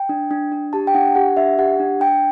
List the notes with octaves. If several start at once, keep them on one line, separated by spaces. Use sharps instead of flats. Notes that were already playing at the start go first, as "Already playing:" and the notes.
Already playing: G5
D4
D4
D4
G4 A5
G5
D4 F#5
G4 F#5
D4 E5
G4 F#5
D4
D4 G5